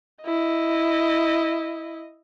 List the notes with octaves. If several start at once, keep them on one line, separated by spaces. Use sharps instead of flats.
E4 D#5